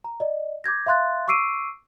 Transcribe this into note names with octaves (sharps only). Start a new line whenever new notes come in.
A#5
D5 D#5
D6 G6 G#6 A#6
E5 F5 C6 F#6 A6
C#6 D6 E6 C7 D7 D#7